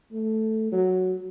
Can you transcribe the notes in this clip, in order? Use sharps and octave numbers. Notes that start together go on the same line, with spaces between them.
A3
F#3